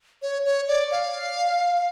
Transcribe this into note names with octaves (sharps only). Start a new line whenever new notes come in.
C#5
C#5
D5
F5